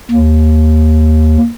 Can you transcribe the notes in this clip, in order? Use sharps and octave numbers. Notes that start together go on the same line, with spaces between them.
D#2